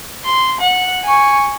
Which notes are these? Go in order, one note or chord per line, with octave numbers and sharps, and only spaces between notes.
C6
F#5
G#5 C#6